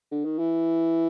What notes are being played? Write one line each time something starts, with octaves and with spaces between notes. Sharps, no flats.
D3
D#3
E3